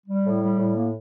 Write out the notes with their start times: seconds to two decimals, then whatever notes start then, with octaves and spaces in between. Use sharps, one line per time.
0.07 G3
0.24 A2
0.41 G3
0.58 A2
0.75 A#3